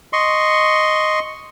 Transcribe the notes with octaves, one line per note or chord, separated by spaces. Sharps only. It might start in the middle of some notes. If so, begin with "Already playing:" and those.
D#5 C6 C#6